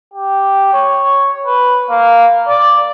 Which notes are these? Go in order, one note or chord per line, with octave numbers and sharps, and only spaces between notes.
G4
C#5
B4
A#3
D5